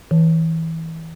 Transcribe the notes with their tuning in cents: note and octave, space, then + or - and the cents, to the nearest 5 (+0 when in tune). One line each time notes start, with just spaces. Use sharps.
E3 -20